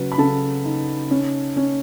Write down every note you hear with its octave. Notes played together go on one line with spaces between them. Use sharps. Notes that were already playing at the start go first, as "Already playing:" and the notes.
Already playing: C#3 F#3 B4
B5
C#3 A4 A5
D#4
C#4
C#4